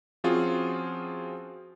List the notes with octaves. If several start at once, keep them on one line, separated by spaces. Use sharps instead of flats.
F3 C4 C#4 F4 F#4 G#4